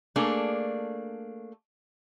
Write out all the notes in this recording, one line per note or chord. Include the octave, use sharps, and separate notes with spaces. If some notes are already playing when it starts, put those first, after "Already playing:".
A3 A#3 D4 G#4